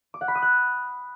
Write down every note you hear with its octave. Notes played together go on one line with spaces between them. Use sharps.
D6
F#5
B5
D#6
F#6